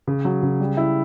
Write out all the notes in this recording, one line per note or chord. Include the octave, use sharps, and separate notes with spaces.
C#3
F#3
C#3
G3
E4